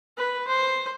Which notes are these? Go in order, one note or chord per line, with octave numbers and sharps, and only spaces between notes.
B4
C5